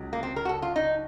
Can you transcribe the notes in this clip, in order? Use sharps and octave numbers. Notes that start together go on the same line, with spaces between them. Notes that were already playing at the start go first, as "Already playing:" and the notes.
Already playing: C#2 C#3 F#3
A#3
C4
A#4
F#4
A4
F4
D#4